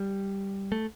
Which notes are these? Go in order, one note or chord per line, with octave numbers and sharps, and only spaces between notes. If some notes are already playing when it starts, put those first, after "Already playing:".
Already playing: G3
A3